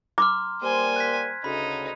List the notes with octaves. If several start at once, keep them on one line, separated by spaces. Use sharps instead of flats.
A#5 C6 D6 F6
G3 A#3 C5 G#5
F#6 G#6 B6
D2 C#3 D#4 B5